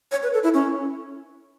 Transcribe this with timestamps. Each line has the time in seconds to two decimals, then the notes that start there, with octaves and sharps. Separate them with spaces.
0.11 C#5
0.23 B4
0.34 A4
0.44 E4
0.54 C#4